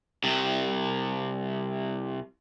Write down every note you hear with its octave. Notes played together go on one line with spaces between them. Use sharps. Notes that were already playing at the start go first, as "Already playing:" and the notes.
C2 C3